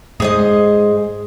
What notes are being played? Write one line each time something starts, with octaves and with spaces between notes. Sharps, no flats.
G#2 G#3 G#4 C5 D#5